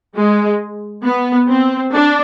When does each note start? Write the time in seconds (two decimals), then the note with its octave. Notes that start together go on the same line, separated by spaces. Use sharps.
0.16 G#3
1.05 B3
1.48 C4
1.92 D4